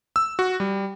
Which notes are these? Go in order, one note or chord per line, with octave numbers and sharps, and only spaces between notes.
E6
F#4
G3